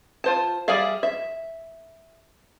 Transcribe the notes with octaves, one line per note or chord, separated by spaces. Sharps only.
F4 C5 A5
G3 G#4 D5 E5 F5
E5